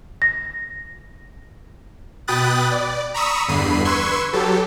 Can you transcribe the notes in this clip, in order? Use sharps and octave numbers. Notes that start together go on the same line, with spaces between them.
A#6
B2 G5 B5 D#6 F#6 A6
D5
A#5 B5 C#6 D#6 E6
E2 G2 D3 B5 C7 D#7
B4 C6 C#6 E6 G#6
F#3 G4 A4